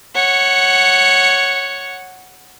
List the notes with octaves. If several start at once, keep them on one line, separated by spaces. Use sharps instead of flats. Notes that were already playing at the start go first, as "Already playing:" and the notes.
C#5 F#5